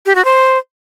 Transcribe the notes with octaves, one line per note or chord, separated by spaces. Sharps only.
G4
F#4
C5